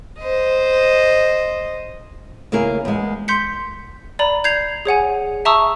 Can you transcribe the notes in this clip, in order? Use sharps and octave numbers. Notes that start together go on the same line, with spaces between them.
C5 D#5
C#3 A#3 E4 G#4 A#4
E2 G#3
C6 G6 B6 C#7
D5 A#5 B5
G6 G#6 C7 F7
G#4 C#5 F#5 G#5
E5 A5 A#5 C#6 D#6 E6